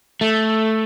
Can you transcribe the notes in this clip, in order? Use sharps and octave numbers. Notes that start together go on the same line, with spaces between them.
A3